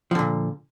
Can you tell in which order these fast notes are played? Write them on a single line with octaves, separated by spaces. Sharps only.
F3 D3 A#2